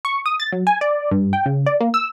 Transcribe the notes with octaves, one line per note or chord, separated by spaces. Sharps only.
C#6
D#6
A6
F#3
G#5
D5
G2
G5
C#3
D5
A#3
E6